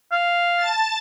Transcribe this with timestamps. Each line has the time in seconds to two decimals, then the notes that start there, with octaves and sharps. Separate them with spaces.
0.12 F5
0.56 A5 A6